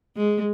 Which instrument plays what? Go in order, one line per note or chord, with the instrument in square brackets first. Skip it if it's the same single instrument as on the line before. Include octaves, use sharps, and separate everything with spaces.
[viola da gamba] G#3